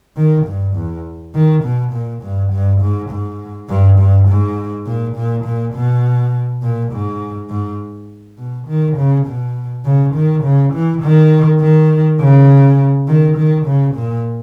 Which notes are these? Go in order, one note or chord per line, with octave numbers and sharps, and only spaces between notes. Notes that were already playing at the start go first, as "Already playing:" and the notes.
D#3
G2
E2
D#3
B2
A#2
G2
G2
G#2
G#2
G2
G2
G#2
A#2
A#2
A#2
B2
A#2
G#2
G#2
B2
D#3
C#3
B2
C#3
D#3
C#3
E3
D#3
D#3
C#3
D#3
D#3
C#3
A#2